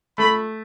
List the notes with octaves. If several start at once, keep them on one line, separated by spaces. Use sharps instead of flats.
A3 B5